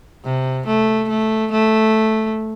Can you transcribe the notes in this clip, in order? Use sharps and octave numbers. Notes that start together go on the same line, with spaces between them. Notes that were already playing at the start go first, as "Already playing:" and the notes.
C3
A3
A3
A3